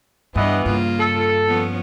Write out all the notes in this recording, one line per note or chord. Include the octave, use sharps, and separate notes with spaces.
G2 E3 G3 B3 D4 D#5
G2 C#3 A#3 F4
A4
F3 B3 C#4